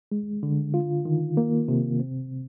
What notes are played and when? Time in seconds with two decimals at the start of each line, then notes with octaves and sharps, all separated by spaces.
0.12 G#3
0.43 D3
0.74 F4
1.05 D#3
1.37 A#3
1.68 C3
2.00 C4